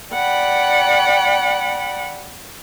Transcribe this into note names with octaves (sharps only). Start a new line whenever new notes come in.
D5 F#5 G5 B5